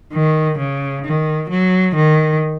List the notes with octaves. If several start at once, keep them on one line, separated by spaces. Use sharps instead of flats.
D#3
C#3
D#3
F#3
D#3